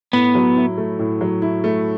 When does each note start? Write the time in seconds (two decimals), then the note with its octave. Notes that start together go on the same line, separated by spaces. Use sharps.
0.13 A2 B3
0.35 F#3
0.56 E4
0.78 A3
0.99 A2
1.21 F#3
1.42 E4
1.64 A3